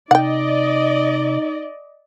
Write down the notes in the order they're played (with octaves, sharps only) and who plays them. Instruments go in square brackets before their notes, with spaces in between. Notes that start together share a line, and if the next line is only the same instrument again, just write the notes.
[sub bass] C3 [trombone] D#4 [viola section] D5 D#5 [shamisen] F#5 G5